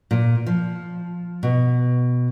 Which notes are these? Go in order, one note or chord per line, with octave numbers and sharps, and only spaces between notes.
A#2
F3
B2